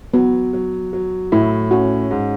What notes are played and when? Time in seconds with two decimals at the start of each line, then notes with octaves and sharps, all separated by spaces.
0.14 F#3 B3
0.53 F#3
0.93 F#3
1.32 A2 E4
1.71 C#4 F#4
2.11 G#2